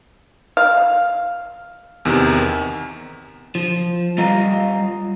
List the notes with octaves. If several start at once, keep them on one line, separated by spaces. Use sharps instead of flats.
F5
E2 C3 D#3
F3
G3 F4 D#5 F5 A#5